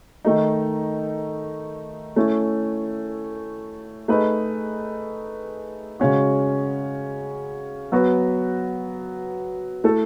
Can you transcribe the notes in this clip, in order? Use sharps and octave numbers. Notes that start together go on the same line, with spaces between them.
D#3 A3 D#4
A3 C#4 E4
A3 D#4 G#4 B4
C#3 G#3 C#4 F#4
F#3 B3 F#4 B4
A3 E4 A4